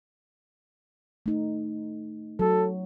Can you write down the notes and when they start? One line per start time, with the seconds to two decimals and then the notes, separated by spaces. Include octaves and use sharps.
1.26 A3 D#4
2.39 F#3 A4